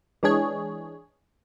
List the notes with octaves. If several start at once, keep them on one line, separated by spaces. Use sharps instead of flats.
E3 G#3 D4 G#4 C#5